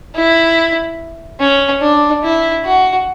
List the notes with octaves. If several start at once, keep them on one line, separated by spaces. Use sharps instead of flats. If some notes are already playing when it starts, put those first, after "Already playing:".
E4
C#4
D4
E4
F#4